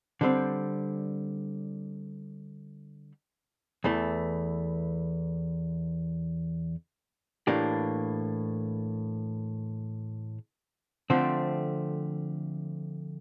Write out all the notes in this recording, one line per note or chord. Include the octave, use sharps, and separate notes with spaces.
D3 G3 C4
E2 E3 A3
A2 E3 A#3 D4 G4
D3 F3 A3 C4